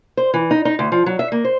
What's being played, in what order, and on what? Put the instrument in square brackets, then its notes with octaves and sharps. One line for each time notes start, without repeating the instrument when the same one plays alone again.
[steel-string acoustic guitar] C5
E3
D#4
D#4
D2
F3
F#3
E5
A#3
C5